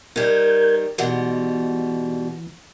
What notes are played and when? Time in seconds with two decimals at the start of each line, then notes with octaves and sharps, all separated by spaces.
0.16 D#3 G3 A#4 G6 G#6
0.98 G#2 B2 E3 G3